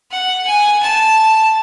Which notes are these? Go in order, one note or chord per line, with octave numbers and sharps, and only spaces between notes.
F#5
G#5
A5